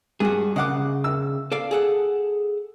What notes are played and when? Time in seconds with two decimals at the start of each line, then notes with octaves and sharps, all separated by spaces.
0.20 G2 F#4 G#4
0.56 C#3 D#5 F#5 D6
1.04 E6
1.52 A4 D5 F5
1.71 G#4 A4 F#5